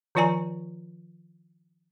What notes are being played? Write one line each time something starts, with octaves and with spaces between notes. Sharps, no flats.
D#3 F3 F4 D5 G#5 A#5